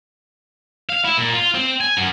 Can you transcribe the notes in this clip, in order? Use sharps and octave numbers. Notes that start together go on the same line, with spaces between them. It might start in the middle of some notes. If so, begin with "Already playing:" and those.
F5
E4
A#2
F4
C4
G#5
F#2